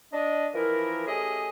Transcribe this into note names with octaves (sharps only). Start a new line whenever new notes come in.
D4 D#5
E3 F3 E4 A#4
A3 C#4 G4 G#4 D#5 G#5